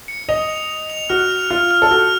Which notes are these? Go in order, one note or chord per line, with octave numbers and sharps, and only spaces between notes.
C#7
D#5 F7
F7
F7
F7
F#4 F6
F7
F4 F6
F6
A4
F#4 F6